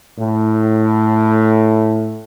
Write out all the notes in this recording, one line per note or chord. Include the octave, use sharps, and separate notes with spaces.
A2